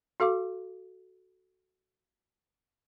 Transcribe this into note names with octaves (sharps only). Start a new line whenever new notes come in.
F#4 A4 F5 D6